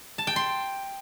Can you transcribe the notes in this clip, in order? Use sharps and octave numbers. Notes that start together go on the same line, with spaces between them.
A5
G5
C6